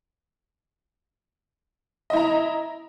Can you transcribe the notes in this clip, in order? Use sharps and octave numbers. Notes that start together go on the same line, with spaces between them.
E4 D#5 A#5